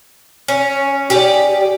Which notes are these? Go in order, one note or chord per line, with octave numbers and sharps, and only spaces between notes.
C#4
G4 G#4 D5